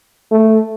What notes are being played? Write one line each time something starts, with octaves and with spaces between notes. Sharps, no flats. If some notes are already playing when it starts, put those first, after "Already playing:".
A3